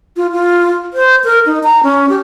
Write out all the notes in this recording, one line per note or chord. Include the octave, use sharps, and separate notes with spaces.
F4
F4
C5
A#4
D#4
A#5
C#4
G4